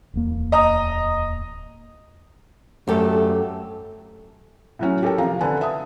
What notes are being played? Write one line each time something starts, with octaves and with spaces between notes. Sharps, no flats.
D1 E2 A#3
D#5 A#5 D#6
F#2 A3 G4 A4
A2 F#3 C#4
G4 A4 A#4 C#5 G5
C3 F3 F5 A#5
D3 B4 G#5 A5
E5 A5 D#6